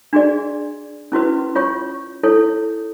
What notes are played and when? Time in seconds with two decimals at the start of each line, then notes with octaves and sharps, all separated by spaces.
0.13 D4 F#4 G#4 D5
1.12 C#4 E4 F#4 B4
1.55 F4 C#5 C#6
2.23 E4 A4 C#5